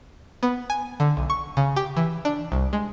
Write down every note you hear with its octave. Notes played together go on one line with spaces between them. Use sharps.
B3
G#5
D3
B1
C#6
C#3
G4
E3
D4
C2
G#3